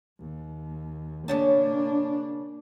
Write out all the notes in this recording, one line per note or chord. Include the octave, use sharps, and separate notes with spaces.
D#2
C#3 A#3 C#4 D4 A5